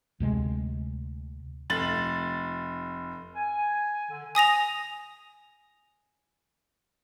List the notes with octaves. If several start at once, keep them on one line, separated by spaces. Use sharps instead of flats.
D2 C3 G#3
F1 A6 F#7
G#5
D3
G#5 D#6 A#6 F7